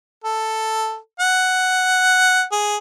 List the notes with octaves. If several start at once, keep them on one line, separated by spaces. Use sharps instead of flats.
A4
F#5
G#4